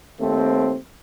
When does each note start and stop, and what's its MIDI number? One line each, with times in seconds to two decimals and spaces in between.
0.20 0.75 39
0.20 0.75 57
0.20 0.75 60